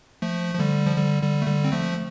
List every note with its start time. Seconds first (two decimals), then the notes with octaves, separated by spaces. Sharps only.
0.22 F3 A3
0.54 F3
0.59 D3 G3
0.87 F3
0.97 D3 G3
1.23 D3 G3
1.42 A3
1.47 D3 G3
1.64 C4
1.72 F3 A3